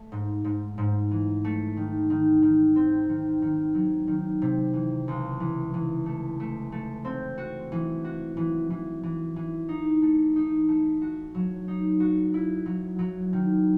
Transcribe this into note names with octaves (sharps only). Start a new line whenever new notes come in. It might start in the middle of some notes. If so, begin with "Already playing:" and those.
Already playing: A3
G#2
G#2
G#2
E3
A3
D#3
D#3
D#3
C4
D#3
D#3
F#3
D#3
C3
E3
C#2
E3
E3
A3
A3
A3
C4
F#4
E3
F#4
E3
E3
E3
E3
D#4
A3
D#4
A3
F#4
F#3
D#4
F#4
E4
F#3
F#3
D#3